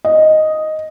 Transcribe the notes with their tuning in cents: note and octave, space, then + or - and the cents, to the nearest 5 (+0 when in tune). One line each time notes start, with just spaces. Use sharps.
D#5 +0